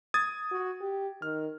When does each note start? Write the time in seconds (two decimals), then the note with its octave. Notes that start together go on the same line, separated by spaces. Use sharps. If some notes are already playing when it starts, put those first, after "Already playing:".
0.14 D#6 G#6 A6
0.52 F#4
0.81 G4
1.22 D#3 F6